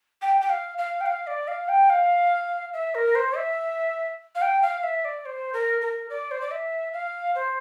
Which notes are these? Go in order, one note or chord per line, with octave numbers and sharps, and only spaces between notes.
G5
G5
F5
F5
G5
F5
D5
F5
G5
F5
E5
A#4
C5
E5
F5
G5
F5
E5
D5
C5
A#4
A#4
D5
C5
D5
E5
F5
C5